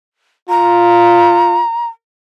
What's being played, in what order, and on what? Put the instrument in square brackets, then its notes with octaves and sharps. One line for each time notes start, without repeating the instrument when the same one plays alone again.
[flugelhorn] F4 [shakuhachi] A#5